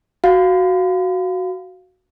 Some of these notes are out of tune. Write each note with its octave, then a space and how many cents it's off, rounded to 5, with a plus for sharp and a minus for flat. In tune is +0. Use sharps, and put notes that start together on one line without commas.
F#4 +0 F5 +0